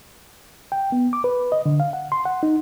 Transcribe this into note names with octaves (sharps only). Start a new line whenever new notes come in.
G5
B3
D6
B4
D#5
D3
F5
F#5
C6
F#5
D#4